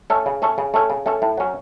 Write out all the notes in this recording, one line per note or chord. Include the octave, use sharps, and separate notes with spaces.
A3 C#4 A4 C#5
C#3
A3 C#4 A4 C#5
C#3
A3 C#4 A4 C#5
C#3
A3 C#4 A4 C#5
A2
F#3 C#4